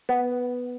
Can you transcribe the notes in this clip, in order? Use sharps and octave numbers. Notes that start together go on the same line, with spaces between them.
B3